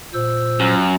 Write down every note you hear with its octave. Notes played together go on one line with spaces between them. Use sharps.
A#2 C5 E6
F#2